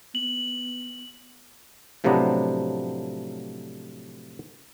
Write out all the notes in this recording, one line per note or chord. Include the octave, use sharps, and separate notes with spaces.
B3 F#7
A2 C3 F3 F#3 B3 D4